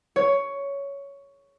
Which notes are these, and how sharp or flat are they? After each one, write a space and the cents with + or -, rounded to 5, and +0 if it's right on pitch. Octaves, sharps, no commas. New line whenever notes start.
C#5 +10